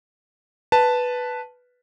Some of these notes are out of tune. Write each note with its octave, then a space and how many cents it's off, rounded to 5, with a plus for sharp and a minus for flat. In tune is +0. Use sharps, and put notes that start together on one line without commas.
B4 +0 A5 +0